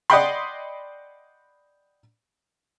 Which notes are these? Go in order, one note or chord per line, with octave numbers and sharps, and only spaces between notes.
D5 D#5 F#5 G5 B5 C6